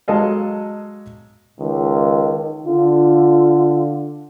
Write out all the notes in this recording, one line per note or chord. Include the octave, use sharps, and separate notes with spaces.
F#3 G#3 A4 D#5 F5
C#2 D#3
D3 F4